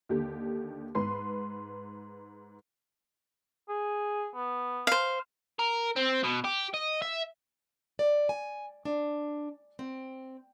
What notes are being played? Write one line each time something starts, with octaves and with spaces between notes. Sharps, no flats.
D#2 D3 G4
G#2 B4 C6
G#4
B3
C5 F5
A#4
C4
B2
G4
D#5
E5
D5
G#5
D4
C4